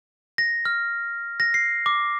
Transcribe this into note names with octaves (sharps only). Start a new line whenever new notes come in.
A#6
F6
A#6
C7
D6